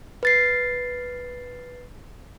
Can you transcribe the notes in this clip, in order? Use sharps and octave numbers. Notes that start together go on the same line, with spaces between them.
B4 A6 C7